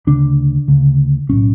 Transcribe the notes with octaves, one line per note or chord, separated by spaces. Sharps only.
D2 C#3 D4
D2 C#3
B1 A2 C#4